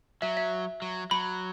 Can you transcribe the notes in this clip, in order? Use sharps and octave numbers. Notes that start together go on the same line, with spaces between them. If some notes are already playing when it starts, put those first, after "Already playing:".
F#3 E5
E5
F#3
F#3 B5